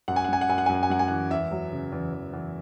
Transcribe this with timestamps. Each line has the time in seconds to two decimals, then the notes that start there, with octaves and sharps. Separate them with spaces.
0.08 F#2 F#5
0.16 G#5
0.24 F#5
0.28 F#2 G#5
0.41 F#5
0.49 F#2 G#5
0.58 F#5
0.66 F#2 G#5
0.75 F#5
0.83 G#5
0.90 F#2 F#5
0.99 G#5
1.08 E3 F#5
1.31 E2 E5
1.51 F#3
1.72 C#3
1.92 E2
2.13 E2
2.33 E2